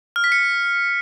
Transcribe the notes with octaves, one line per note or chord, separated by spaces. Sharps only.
F6
B6
C#7